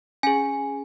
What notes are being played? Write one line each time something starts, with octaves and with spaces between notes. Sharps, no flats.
C#4 G#4 G#5